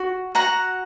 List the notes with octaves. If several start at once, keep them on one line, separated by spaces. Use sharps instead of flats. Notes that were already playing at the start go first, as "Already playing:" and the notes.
Already playing: F#4
F#4 F#5 A#5